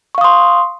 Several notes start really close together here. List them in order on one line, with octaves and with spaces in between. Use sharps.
C#6 F5 D#6 C6